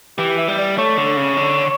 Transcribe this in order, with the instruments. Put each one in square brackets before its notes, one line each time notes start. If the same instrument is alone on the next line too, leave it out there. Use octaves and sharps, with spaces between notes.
[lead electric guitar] E3 [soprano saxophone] G4
[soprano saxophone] E5
[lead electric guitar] G3
[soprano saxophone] D5
[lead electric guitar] A3 [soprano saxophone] C#5
[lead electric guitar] D3
C#3
D3